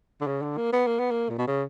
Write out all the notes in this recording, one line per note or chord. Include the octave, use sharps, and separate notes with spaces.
D3
C#3
D3
A#3
B3
A#3
B3
A#3
A#2
B2
C#3